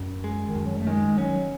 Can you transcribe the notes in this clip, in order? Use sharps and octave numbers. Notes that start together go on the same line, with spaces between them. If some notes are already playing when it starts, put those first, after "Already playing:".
Already playing: F#2
G#3
D#3
F#2
F#3
A3
D#3 G#3
F#3 C#4